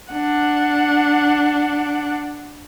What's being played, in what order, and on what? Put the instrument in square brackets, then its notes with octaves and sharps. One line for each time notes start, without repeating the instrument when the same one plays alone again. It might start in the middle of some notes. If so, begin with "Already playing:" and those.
[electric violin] D4 F#5